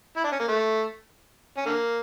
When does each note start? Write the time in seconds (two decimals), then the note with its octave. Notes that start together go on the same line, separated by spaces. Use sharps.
0.17 E4
0.24 D4
0.32 C#4
0.40 A#3
0.48 A3
1.57 C#4
1.66 D3 A#3